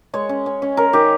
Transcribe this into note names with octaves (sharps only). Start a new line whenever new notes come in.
G#3 C#5
C#4
C#4
C#4
C#4 A#4
D#3 G4